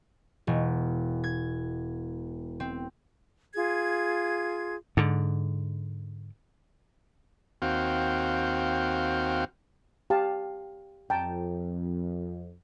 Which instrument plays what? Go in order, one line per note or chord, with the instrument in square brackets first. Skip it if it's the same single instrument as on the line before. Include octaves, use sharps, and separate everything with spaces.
[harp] E1
G#6
C4
[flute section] F4 G#4 G#6
[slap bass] G#2 D3
[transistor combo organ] D#2 C4 F#4 F5 G5
[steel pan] G4 F5 A5
[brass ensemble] F2 [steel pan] G5 A5 A#5